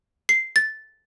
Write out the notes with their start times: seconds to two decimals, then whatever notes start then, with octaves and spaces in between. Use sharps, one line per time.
0.29 C7
0.56 A6